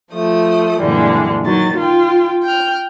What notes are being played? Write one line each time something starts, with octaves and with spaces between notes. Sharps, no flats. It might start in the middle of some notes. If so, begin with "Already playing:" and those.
F3 A3 D#6
F#2 A#2 D3 E3 G3 G#3
D#3 F#3 A6
F4 G5
G5 F6